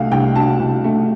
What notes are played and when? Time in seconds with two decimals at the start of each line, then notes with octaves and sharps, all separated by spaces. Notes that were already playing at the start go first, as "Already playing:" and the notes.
Already playing: C2 B2 A3 F5
0.12 C2 G5
0.35 B2 A5
0.60 C2
0.84 A3